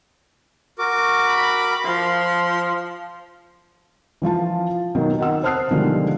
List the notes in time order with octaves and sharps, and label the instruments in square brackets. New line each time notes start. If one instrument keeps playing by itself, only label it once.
[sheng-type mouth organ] F#4 A#4 D6
[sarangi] B5
[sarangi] F3 [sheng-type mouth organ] C6
[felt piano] E3 F3 F4 A5
B2 D#3 F#3
D#3 F#5 E6
C5 A5 D#6 F6 F#6 C7
B2 D3 D#3 F3 G3 G#3